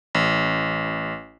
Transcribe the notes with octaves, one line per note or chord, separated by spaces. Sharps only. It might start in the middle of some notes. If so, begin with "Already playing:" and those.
A1